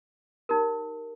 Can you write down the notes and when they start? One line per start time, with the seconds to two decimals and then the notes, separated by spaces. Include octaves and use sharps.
0.49 D#4 G4 A#4